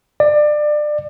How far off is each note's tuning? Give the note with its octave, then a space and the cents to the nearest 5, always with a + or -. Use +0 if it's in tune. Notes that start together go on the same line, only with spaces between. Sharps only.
D5 +25